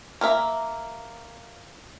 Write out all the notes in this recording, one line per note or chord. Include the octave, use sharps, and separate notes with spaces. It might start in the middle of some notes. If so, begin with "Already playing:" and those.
A#3 A#4 E5